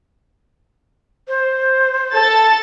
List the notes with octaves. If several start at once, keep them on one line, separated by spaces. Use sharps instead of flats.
C5
A4 A6